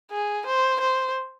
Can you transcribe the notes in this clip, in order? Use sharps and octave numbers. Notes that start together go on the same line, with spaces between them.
G#4
C5
C5